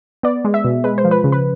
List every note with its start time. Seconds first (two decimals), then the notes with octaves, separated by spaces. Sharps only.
0.23 B3 D5
0.45 G#3
0.54 E5
0.64 B2
0.84 G#3 B4
0.98 C5
1.05 F3
1.11 B4
1.24 C#3
1.32 B4